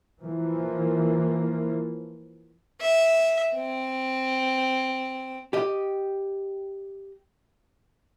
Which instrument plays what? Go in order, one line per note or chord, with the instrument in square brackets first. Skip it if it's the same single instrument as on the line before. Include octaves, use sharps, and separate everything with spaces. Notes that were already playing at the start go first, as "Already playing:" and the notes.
[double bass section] E3 F3 A#3
[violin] E5
C4
[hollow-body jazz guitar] G4 D#5